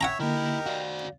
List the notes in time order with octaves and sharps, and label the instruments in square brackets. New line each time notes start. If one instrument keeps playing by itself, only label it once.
[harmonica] C#5 E5 [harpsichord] F#5 G5 A#5
[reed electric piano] D3 A#3 [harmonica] D#4 G4 A#4 [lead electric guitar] E4
[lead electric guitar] F#4 D5 [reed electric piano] F5